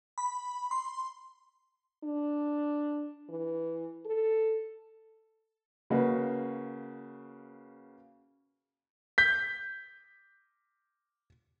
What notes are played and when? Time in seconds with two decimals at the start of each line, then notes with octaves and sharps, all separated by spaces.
0.18 B5
0.71 C6
2.04 D4
3.30 E3
4.06 A4
5.90 C#3 A#3 F#4 B4
9.18 G6 B6